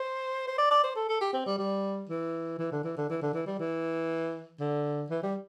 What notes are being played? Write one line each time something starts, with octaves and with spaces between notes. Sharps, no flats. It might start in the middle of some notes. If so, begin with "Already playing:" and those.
Already playing: C5
C5
D5
D5
C5
A4
A4
G4
C4
G3
G3
E3
E3
D3
E3
D3
E3
D3
E3
G3
E3
D3
E3
G3